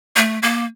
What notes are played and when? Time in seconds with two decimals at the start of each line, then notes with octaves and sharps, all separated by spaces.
0.16 A3
0.42 A#3